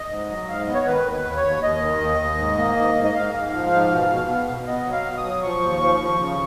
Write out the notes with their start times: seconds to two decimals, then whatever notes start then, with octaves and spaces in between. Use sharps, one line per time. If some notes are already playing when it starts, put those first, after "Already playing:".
Already playing: D#5
0.10 G#2
0.30 F#3
0.49 G#2 F5
0.61 D#5
0.68 B3
0.74 C#5
0.86 D#3 B4
1.06 D#2
1.11 B4
1.25 D#2
1.37 C#5
1.44 D#2
1.62 D#2 D#5
1.82 D#3
2.00 D#2
2.20 D#2
2.38 G#2
2.58 A#3
2.77 G#2
2.95 G#2
3.04 D#5
3.15 G#2 F5
3.34 G#2
3.53 F3
3.72 G#2
3.91 B2
4.10 B2
4.29 B3
4.48 B2
4.67 B3 D#5
4.86 F#3
4.93 F5
5.05 B2
5.17 D#6
5.24 F#3
5.43 F3 C#6
5.63 D#2
5.82 F3
6.01 F3
6.20 C#3